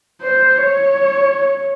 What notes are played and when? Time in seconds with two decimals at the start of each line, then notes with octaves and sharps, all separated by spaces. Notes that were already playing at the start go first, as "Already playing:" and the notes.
0.22 C5
0.58 C#5